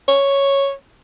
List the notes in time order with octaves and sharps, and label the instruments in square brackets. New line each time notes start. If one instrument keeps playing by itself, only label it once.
[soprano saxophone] C#5